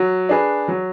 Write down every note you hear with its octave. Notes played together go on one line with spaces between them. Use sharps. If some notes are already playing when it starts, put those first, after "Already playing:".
Already playing: F#3
D4 G#4 B4
F#3